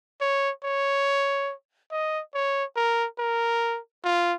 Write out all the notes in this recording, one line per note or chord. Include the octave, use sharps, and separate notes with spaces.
C#5
C#5
D#5
C#5
A#4
A#4
F4